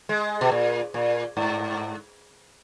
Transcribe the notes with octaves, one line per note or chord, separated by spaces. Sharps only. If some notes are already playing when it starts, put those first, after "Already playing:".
G#3
B2
A#2
A#2
G#2